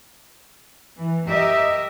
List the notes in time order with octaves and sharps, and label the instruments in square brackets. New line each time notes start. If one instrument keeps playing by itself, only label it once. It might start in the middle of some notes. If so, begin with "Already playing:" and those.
[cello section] E3
G4 A#4 D#5 E5